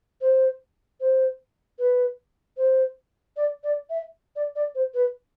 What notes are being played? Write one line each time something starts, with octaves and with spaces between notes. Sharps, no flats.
C5
C5
B4
C5
D5
D5
E5
D5
D5
C5
B4